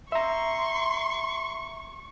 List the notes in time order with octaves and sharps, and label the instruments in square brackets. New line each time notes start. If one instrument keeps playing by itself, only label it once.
[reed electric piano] E5 A#5 [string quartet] C6 [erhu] C#6